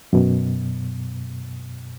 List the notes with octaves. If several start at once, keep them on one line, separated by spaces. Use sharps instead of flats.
F#2 B2